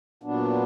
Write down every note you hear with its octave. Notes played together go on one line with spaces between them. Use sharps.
A#2 F#3 B3 D4